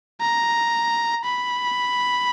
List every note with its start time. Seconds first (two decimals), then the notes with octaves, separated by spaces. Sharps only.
0.21 A#5
1.26 B5